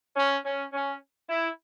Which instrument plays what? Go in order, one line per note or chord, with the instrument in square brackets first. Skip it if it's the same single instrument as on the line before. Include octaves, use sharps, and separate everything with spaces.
[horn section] C#4
C#4
C#4
E4